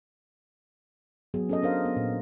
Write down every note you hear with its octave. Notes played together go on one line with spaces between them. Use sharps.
F#3 B3 G#4
C#4 A4 D#5
D4 A#4 C5 F5
B3
A#2